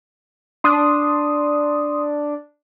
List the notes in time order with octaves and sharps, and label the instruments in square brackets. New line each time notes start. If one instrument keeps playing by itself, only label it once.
[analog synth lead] D4 [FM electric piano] C6 D#6